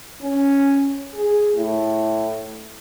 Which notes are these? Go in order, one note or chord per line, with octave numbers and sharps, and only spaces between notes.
C#4
G#4
A2